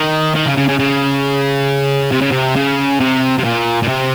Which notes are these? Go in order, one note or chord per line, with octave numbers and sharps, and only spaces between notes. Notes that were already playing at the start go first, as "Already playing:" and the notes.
Already playing: D#3
D#3
C#3
C#3
C#3
C#3
C3
C#3
C3
C#3
C3
C3
A#2
A#2
C3